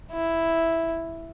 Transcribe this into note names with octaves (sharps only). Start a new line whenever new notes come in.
E4